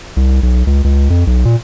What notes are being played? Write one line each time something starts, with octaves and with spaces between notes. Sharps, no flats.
C2
B1
C#2
C#2
F2
B1
A#2